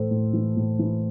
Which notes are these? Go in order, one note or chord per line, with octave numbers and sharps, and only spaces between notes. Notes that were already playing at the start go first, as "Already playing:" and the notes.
Already playing: A2 E3 A4 C5
A2
E3
A2
E3